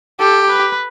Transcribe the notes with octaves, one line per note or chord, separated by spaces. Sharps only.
G4 A4
B4